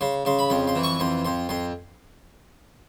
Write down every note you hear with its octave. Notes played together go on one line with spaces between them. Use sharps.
C#3 C6
C#3 C6
B5
F2 C6
C6
E3
C#6
F2 C6
F2 C6
F2 C6